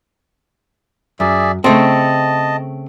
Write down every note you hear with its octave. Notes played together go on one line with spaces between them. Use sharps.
F#2 G#4 D5 E5
C#3 A3 C4 D#5 A5